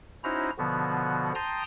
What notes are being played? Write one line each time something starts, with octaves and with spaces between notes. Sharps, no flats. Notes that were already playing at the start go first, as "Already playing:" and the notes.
C#4 D#4 E4 F#4 C5 A#5
B2 D3 F3 B3 F#4
G5 A5 A#5 C6 D#6